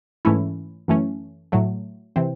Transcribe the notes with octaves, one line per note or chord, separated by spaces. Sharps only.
G#2 E3 A3 C#4 E4
F#2 E3 A3 C#4
A2 F#3 A3
C3 E3 C4